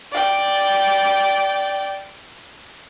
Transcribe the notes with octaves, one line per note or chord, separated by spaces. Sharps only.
D5 G5